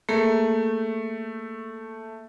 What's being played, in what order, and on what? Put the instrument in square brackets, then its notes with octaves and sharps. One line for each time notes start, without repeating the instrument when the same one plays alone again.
[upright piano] A3 [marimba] A#3 G#4 A#4